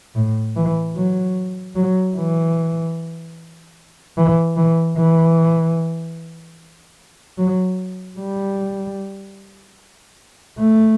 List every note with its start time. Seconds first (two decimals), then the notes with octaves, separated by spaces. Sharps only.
0.15 A2
0.56 E3
0.96 F#3
1.76 F#3
2.17 E3
4.17 E3
4.57 E3
4.98 E3
7.38 F#3
8.19 G3
10.59 A3